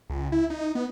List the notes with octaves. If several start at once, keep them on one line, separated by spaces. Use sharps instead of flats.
C#2
E4
D#4
B3